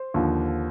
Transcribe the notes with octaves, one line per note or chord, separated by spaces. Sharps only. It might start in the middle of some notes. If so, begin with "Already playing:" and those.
Already playing: C5
D#2 D3 F3